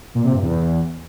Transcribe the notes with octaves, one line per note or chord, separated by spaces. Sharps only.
A#2
C3
G2
E2